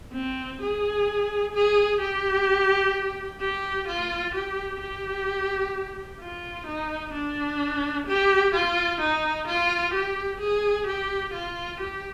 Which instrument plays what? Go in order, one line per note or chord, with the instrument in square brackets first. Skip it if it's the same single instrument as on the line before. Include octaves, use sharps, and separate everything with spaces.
[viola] C4
G#4
G#4
G4
G4
F4
G4
G4
F4
D#4
D4
G4
F4
D#4
F4
G4
G#4
G4
F4
G4